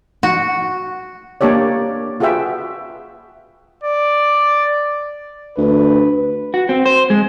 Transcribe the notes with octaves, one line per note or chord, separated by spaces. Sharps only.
F#4
A#3 D4 G4 C#5 D5
F4 F#4 G#4 B4 E5 G5
D5
D2 B4
F#4
C4
C5
G#3